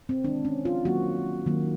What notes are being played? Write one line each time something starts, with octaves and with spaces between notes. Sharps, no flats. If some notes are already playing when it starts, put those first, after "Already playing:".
C4
D#3 G#3 D4
C#4
F4
D#3 F#3 A#3 F#4
D#3 F#3 A#3